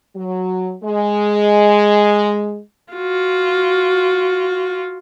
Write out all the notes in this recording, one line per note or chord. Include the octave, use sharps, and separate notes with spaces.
F#3
G#3
F4 F#4